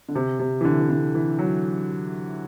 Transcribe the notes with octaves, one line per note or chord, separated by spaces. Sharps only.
D3
C3
C3
E3
D3
E3
D3
E3
F#3